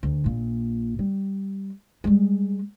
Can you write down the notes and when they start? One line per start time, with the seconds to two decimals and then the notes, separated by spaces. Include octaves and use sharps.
0.03 D2
0.24 A#1 A#2
0.99 G3
2.04 G3 G#3